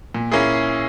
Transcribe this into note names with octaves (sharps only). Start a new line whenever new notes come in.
A#2
A#3 C#4 E4 G#4